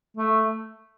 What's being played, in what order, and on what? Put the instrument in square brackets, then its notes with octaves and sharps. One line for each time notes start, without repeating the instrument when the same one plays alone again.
[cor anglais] A3